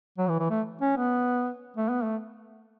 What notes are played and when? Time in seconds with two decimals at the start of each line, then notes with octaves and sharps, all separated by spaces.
0.18 F#3
0.28 E3
0.40 E3
0.50 A3
0.82 C#4
0.98 B3
1.77 A3
1.89 B3
2.03 A3